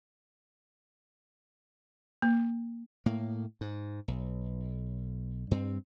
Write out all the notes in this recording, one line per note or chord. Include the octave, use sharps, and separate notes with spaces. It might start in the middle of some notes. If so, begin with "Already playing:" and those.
A#3
A2 A#3
G#2
B1
G2 C4